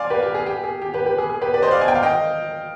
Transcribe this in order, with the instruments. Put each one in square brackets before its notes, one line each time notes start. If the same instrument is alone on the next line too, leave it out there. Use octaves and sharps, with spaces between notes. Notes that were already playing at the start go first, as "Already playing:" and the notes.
Already playing: [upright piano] D5 F5 G#5 C6
G4 B4
G4
G#4
G4
G#4
G4
G4 B4
G4 B4
G#4
G#4
G4 B4
B4 D5
C5 D#5
D5 F5
G#5
G5
F5
D#5 G5